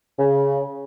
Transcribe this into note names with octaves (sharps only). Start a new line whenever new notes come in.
C#3